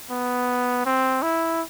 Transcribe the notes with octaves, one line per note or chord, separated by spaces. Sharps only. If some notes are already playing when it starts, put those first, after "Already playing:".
B3
C4
E4